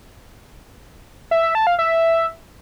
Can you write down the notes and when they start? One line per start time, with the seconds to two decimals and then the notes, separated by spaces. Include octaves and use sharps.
1.31 E5
1.43 E5
1.55 A5
1.67 F5
1.79 E5